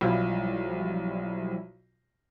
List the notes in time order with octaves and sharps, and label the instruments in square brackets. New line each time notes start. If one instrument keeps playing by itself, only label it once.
[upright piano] B1 F4 [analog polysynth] F3 G3 E4